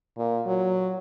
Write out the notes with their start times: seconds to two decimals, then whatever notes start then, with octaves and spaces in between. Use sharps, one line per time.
0.17 A#2
0.46 F#3